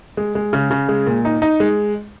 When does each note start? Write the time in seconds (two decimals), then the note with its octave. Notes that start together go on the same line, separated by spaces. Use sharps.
0.17 G#3
0.35 G#3
0.53 C#3
0.71 C#3
0.89 G#3
1.07 A#2
1.25 D#4
1.42 D#4
1.60 G#3